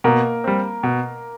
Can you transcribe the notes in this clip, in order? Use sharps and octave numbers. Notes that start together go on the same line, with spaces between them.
B2 A#3 A#4
G3 C4
B2